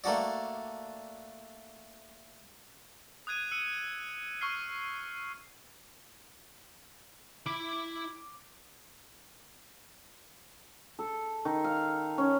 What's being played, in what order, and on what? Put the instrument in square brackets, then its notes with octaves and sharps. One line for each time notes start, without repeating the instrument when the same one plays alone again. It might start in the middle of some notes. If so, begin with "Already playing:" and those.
[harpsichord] A3 A#3 D4 F#4 D5
[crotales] D#6 F#6 G#6 D#7
E6 C#7 D#7
C#6 E6 F6 C7
[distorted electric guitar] E4 B5 [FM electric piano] D6
[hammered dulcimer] A4
D#3
F5
C#4